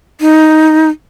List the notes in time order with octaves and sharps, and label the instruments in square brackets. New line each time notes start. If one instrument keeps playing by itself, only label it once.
[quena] D#4